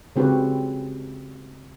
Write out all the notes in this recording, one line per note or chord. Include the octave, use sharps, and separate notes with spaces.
C#3 C4 F#4 G4 B4